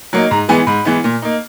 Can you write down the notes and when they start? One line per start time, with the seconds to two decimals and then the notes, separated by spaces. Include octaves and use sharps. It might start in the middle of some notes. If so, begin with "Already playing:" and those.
0.13 F#3 A#3 D#4
0.31 G#2 A#5
0.48 E3 G#3 B3 G#5
0.67 G#2 B5
0.85 E3 G#3 B3
1.04 A#2
1.22 A#3 D#4